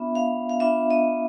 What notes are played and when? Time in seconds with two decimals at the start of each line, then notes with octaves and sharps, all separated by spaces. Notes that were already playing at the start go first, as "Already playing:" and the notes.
Already playing: B3 D4 F4 E5
0.15 F5
0.49 F5
0.60 B3 D4 F4 E5
0.91 D#5